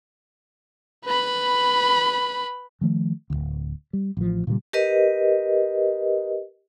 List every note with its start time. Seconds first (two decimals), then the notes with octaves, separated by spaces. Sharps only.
1.05 B4 B5
2.81 D#3 F3 A3
3.30 D1 G1 D2
3.93 G3
4.17 A1 F3
4.47 A#2 C#3 F3 G3
4.73 G4 A#4 B4 D#5